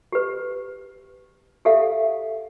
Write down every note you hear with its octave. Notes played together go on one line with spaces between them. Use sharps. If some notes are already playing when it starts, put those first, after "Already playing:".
G4 B4
G4 A4 E5 F5